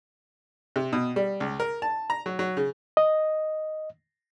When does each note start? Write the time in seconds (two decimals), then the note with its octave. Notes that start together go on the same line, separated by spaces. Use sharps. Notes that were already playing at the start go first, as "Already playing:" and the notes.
0.76 C3
0.93 B2
1.16 G3
1.40 C#2
1.60 A#4
1.82 A5
2.10 A#5
2.26 F#3
2.39 F#3
2.57 C#3
2.97 D#5